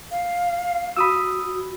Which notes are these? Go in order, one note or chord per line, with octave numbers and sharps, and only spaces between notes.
F5
F#4 B5 D#6 E6